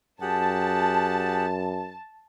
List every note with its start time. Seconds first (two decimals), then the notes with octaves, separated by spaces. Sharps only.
0.21 F#2 G4 G#4 F#5 A5